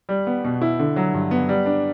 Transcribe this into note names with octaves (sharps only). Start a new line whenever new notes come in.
G3
B3
B2
E4
D3
F#3
G2
B3
G3
D4